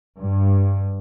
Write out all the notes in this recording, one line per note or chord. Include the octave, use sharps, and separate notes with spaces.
G2